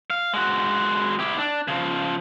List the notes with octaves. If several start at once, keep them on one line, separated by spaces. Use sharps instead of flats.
F5
G#3 F#4
E4 G4
D4
C#3 F3